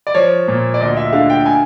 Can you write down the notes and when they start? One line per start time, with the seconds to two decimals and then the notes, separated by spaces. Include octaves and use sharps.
0.07 D5
0.14 F3 C#5
0.48 A#2
0.74 D5
0.80 D2 D#5
0.97 E5
1.13 D3 F5
1.30 G5
1.46 G#5